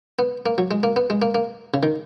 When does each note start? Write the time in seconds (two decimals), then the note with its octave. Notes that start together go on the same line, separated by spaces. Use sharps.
0.19 B3
0.46 A#3
0.58 F#3
0.71 G#3
0.83 A#3
0.96 B3
1.10 G#3
1.22 A#3
1.35 A#3
1.74 C#3
1.83 D#3